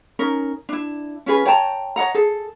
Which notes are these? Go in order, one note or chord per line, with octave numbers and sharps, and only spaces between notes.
C#4 D#4 A#4
D4 E4
C#4 F4 G#4 B4
C#5 G5 A5 A#5
C#5 D#5 F#5 A#5
G#4 A4